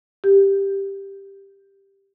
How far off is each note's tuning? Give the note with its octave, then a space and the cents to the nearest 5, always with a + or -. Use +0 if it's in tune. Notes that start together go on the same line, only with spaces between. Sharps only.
G4 +5